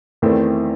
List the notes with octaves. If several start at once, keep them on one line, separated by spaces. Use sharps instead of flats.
E2 D#3 A3 C4 E4